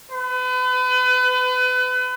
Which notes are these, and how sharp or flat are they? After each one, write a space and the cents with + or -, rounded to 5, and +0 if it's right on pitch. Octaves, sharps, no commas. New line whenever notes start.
B4 +35